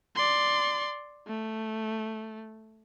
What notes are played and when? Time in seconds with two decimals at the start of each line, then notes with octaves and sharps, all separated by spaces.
0.16 D5 C6
1.27 A3